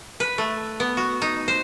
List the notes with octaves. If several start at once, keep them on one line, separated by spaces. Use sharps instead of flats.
B4
A3
B3
F#4
D#4
C5